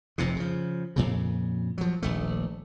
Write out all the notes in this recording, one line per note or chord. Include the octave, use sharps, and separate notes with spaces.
F1 F2 G#2 C3
C#3 F3
F2 A#2 C#3
F3 F#3
D#1 A#1 A3